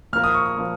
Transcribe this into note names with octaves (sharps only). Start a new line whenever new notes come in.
A#2 F3 A#3 F6
D#6
C#6
D#6
A#2 F3 A#3